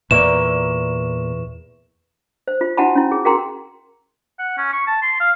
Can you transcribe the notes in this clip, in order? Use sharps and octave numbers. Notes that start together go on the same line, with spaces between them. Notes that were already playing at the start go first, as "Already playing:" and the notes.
E2 A#2 A#3 B4 D5 E5 C#6 E7
C5
F4
E4 F#4 F#5 G#5 A5 B5
C#4 E4
G#4
F#4 G#4 A#4 G5 A#5 C6
F#5
C#4
C#6
A5
C6
F5